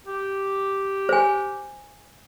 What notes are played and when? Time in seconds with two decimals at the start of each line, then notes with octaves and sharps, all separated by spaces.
0.07 G4
1.09 C5 G#5